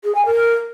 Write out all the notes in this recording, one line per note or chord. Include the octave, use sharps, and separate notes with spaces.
G#4
G#5
A#4